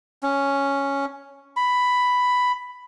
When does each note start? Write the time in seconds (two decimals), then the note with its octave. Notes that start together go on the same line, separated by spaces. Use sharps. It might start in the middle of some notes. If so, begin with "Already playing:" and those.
0.23 C#4
1.56 B5